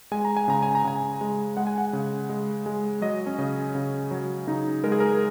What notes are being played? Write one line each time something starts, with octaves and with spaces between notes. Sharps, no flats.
G#3 G#5
A#5
G#5
C#3 A#5
G#5
A#5
C#3 G#5
G#3
G#3 F#5
G#5
F#5
C#3
G#3
G#3
F#3 D#5
C#4
C#3
C#3
F#3
C#3 D#4
G#3 A#4
G#4
A#4